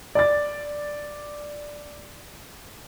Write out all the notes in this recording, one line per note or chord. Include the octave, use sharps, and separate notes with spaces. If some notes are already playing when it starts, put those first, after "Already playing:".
D5 D6 A6